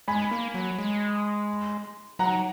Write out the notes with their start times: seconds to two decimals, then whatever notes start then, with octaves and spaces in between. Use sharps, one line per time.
0.08 G#3 G#5 B5
0.31 A#3
0.54 F#3
0.79 G#3
2.19 F#3 F#5 A#5